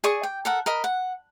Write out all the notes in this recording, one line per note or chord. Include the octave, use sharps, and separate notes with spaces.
G#4 D5 C#6 D#6
G5
A4 A#4 F#5
A#4 D#5 B5
F#5